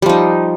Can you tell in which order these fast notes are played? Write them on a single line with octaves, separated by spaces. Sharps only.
G3 F3 D#4